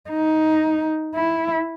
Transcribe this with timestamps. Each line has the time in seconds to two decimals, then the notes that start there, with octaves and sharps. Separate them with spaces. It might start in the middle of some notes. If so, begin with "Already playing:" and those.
0.10 D#4
1.15 E4